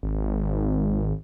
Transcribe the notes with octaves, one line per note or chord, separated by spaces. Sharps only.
G#1